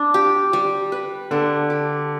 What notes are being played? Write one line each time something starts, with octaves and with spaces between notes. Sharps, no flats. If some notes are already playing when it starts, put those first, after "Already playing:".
Already playing: D4
G4
G3
B4
D3 D4
G4